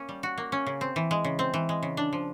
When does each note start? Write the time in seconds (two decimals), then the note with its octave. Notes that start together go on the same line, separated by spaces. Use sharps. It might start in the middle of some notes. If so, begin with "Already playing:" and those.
Already playing: A#3 C#4
0.09 G3
0.23 F#4
0.38 A#3
0.52 C#4
0.67 C#3
0.81 C4
0.96 E3
1.11 G#3
1.24 C#3
1.39 C4
1.54 E3
1.69 G#3
1.83 C#3
1.97 D4
2.13 F3